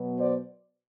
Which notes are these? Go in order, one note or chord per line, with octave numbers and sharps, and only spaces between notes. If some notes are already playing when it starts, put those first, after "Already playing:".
Already playing: B2 F#3 B3
C5 D5